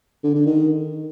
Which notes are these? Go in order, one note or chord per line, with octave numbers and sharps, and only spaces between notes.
D3
D3
D#3